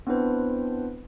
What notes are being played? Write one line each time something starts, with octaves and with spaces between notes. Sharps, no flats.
B3 C4 D4 E4 B4 C5